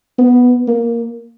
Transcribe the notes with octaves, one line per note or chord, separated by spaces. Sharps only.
B3
A#3